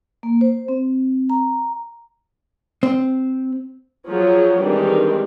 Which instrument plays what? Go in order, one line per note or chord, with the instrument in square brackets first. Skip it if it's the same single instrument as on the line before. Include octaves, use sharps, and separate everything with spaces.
[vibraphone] A#3
C5
C4
A#5
[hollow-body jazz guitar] C4
[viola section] F3 F#3 G#4 C#5
D#3 E3 G3 G#3 C4 D4